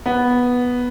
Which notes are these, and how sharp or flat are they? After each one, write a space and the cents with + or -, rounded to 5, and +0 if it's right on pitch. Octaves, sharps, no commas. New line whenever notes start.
B3 -5